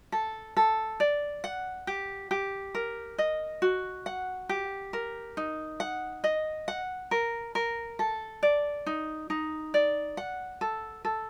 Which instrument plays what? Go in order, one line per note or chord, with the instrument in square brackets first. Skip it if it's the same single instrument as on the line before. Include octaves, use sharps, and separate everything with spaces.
[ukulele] A4
A4
D5
F#5
G4
G4
A#4
D#5
F#4
F#5
G4
A#4
D#4
F#5
D#5
F#5
A#4
A#4
A4
D5
D#4
D#4
D5
F#5
A4
A4